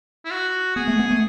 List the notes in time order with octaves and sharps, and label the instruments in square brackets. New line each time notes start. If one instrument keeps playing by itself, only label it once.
[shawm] E4
F#4
[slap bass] B3 [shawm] G#4
[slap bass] A3
B3
A3